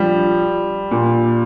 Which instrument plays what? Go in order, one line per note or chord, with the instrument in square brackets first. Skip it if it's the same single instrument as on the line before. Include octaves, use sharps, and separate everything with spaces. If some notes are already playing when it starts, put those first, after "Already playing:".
Already playing: [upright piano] F3 G3
A#2